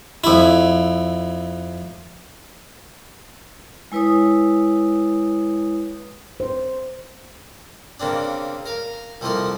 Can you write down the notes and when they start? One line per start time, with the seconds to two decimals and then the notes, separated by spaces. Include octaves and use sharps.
0.24 F2 E4
3.92 G#3 E4 B4 C#5 D#6
6.40 C5
8.00 C#3 A#3 C4 D4
8.66 A#4 F5
9.21 C2 F3 A3 A#3 D#5 C6